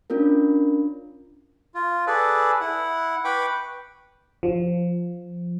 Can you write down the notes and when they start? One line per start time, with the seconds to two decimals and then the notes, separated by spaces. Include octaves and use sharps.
0.10 C#4 D4 F4 A#4
1.74 F4
2.07 G#4 A4 B4 D5
2.61 E4 F#5
3.25 B4 G5 B5 C#6 D6
4.43 F3